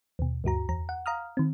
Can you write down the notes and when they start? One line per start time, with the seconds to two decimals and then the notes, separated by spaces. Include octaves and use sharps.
0.19 D#2 B2
0.44 D2 G2 F#4 A#5
0.69 E2 A#5
0.89 F#5
1.06 F5 A#5 D#6 F6
1.37 D#3 C4